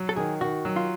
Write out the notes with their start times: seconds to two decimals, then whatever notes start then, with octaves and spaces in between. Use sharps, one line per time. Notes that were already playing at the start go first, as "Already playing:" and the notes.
Already playing: F#3
0.09 A4
0.16 D#3 G#4
0.41 D#3 F#4
0.65 F#3
0.76 F4